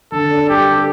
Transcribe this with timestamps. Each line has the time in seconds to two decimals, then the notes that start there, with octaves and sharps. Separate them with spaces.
0.12 D3 A4
0.31 D4
0.49 G3 G4
0.67 A4